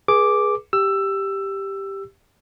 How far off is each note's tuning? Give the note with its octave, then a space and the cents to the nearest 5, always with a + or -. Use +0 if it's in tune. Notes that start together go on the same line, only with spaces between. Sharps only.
G#4 +0 B4 -35 D6 +0
G4 +0 E6 +15